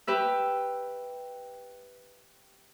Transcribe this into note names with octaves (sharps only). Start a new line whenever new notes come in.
G4 B4 E5